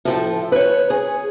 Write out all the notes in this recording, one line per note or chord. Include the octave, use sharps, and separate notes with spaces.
A2 F3 A4
B4 C#5
G#4